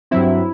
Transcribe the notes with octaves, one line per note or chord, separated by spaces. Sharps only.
G2 F#3 C4 E4